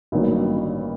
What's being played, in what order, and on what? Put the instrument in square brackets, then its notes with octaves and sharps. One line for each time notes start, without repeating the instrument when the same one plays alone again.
[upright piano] A1 G2 D#3 F#3 A#3